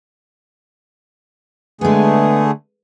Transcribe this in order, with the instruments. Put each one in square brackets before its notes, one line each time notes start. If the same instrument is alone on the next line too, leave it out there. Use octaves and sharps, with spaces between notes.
[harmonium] D3 A3 G#4 [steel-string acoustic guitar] G#3 B3